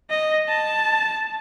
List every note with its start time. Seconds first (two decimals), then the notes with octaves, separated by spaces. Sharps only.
0.10 D#5
0.49 A5